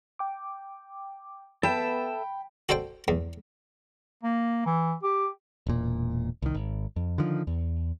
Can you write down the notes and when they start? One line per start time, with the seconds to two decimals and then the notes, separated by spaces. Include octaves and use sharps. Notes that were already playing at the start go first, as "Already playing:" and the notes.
0.19 G5 D6
1.63 B3 A4 E5 G5 A5 B5
2.69 F#4 A4 C5 D5 G5
3.08 E2
4.23 A#3
4.66 E3
5.03 G4
5.67 E1 A#2
6.42 C2 D#3
6.54 G#1
6.96 F2
7.18 D3 D#3 F3
7.47 E2